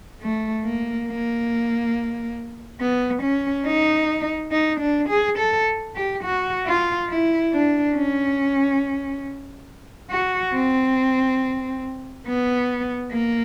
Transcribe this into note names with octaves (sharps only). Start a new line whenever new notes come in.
A3
A#3
A#3
B3
C#4
D#4
D#4
D4
G#4
A4
G4
F#4
F4
E4
D4
C#4
F#4
C4
B3
A#3